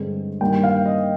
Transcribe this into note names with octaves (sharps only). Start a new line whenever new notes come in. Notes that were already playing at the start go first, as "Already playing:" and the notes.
Already playing: G2 D3 G#3 C4
G2 D#3 G3 A#3 G5
F5
D#5